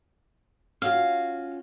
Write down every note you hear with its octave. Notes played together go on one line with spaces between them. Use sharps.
C#4 F4 F#4 F5